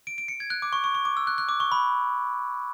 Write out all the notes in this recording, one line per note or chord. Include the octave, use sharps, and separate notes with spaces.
D7
D7
C#7
G#6
F#6
D6
C#6
C#6
C#6
D6
E6
F#6
F#6
D6
C#6
B5